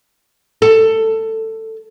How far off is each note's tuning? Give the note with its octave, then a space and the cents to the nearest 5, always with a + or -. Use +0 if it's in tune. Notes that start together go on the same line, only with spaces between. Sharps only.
A4 +15